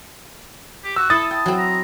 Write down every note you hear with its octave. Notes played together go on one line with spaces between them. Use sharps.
G4
F#4 E6
E4 A4 D#6 A6
G5 A5
F#3 C4
A#5